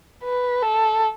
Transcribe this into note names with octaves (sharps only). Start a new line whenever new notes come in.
B4
A4